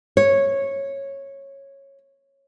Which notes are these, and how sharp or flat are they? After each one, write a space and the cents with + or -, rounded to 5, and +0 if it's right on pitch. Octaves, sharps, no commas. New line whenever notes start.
C#5 -10